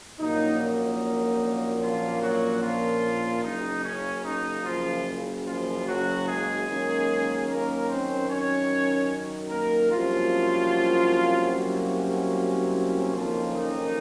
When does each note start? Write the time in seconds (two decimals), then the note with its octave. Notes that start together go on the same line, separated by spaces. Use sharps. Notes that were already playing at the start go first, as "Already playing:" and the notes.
0.19 A#1 A#2 F#3 A#3 C#4 D#4
0.60 D#4
1.81 F3 F4
2.21 F#3 F#4
2.62 F3 F4
3.43 F#1 F#2 C#3 D#4
3.84 C#4
4.24 D#4
4.65 F3 F4
5.46 F3 F4
5.86 F#3 F#4
6.27 G#3 G#4
6.68 F#2 D#3 A#3 C#4
7.48 A#3 A#4
7.89 C4 C5
8.29 C#4 C#5
9.50 A#3 A#4
9.91 C2 C3 F3 F#3 A#3 C#4 F4
11.52 F#3 F#4
13.15 F#1 F2 D#3 F3 A#3 C#4 F4
13.55 D#4